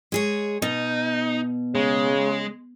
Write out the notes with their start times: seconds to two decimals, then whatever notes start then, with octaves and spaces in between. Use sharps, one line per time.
0.12 G#3 G#4 C#5
0.62 B2 D#4
1.75 C#3 G#3